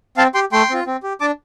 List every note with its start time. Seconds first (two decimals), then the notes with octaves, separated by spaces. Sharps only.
0.17 C4 F5 A5
0.34 G4 G5 C6
0.52 A3 G5 C6
0.70 C4 F4
0.87 C4
1.03 G4
1.20 D4 A5 D6